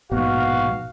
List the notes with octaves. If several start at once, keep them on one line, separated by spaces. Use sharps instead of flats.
A#1 G#2 B2 F#4 F5